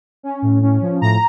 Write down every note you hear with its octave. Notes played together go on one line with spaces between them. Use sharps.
C#4
A2
C#4
F3
A2 A#5